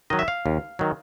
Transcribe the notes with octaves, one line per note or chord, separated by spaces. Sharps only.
D#3 F#3 D#5
E5
F5
D#2
D#3 F#3